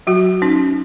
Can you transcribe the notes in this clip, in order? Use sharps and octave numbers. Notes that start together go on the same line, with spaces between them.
F#3 F#4
C#4 D#4